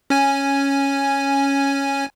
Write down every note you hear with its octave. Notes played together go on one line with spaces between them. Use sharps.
C#4 G#5